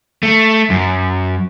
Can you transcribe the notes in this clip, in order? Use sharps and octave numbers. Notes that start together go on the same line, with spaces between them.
A3
F#2